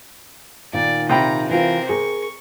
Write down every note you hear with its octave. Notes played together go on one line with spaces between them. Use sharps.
A#2 D#3 D5
C3 G5 A#5 B5
E3 C4 F4 A#4
G#4 A#4 C#6